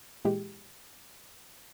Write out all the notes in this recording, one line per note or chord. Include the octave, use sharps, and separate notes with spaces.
A#2 E3 G#3 G4